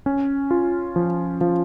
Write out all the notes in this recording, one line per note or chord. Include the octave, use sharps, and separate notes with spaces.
C#4
F4
F3
F3